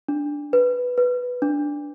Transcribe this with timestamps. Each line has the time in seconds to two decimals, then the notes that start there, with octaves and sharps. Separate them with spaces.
0.08 D4
0.53 B4
0.98 B4
1.42 D4